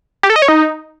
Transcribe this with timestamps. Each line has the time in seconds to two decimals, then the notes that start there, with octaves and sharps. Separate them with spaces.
0.23 G4
0.30 A4
0.36 D#5
0.42 C#5
0.48 D#4